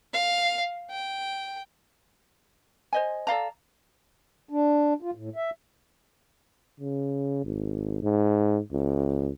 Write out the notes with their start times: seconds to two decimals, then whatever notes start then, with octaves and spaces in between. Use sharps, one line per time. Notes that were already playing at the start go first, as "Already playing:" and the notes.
0.13 F5
0.91 G5
2.93 C5 D#5 G#5
3.27 A4 D5 F5 A#5
4.50 D4
5.02 F4
5.15 A2
5.36 E5
6.80 C#3
7.45 G#1
8.03 G#2
8.72 C#2